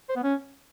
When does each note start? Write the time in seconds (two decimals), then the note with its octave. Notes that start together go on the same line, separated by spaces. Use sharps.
0.09 C5
0.16 B3
0.23 C#4